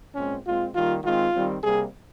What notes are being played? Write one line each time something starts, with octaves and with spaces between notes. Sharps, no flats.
A#2 G#3 C4 C#4
A#2 G#3 C4 F4
D#3 G3 A#3 F4
D#3 G#3 C4 F4
D#3 G3 C4
C3 G3 A#3 G#4